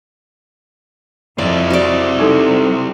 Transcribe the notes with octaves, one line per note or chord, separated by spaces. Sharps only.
F2 C4 E4 D5
F#4 D5
C3 G3 D#4 A4